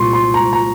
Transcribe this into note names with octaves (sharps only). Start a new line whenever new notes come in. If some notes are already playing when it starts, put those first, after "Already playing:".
Already playing: C2 A#2 C6 C#6
C6
A#5
A#5